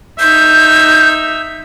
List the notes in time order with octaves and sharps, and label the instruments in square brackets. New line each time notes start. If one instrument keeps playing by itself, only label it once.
[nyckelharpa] D#4 E5 [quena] G6